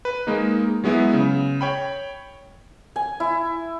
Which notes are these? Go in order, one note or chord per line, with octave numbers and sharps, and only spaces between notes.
B4
G#3 A#3 D#4
F#3 G#3 B3 E4
C#3
C#5 G5 B5
G#5
E4